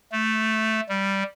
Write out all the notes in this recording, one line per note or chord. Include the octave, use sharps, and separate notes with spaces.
A3
G3